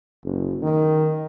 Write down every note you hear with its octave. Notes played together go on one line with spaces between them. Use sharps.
F#1
D#3